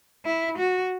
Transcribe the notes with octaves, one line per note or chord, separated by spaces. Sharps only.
E4
F#4